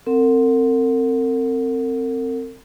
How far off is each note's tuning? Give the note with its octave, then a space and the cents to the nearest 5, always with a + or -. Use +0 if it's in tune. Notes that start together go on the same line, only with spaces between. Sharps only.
C4 +0 A#4 -45 F#5 -20